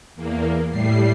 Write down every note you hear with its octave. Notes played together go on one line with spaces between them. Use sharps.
E2 A#3
A2 G3 C7